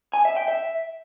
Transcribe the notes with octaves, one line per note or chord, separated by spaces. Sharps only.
G#5
E5
G5
E5